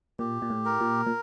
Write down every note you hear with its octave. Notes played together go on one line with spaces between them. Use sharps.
A#2 G4
A#2
A2
A#4
A#2
A#2